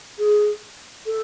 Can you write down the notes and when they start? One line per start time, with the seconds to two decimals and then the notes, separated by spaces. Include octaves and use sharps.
0.18 G#4
1.06 A4